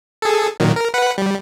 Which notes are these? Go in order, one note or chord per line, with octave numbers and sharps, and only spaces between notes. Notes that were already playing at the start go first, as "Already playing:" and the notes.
G#4 A4
A#2 D#3 F#3
A#4
B4 F#5
G3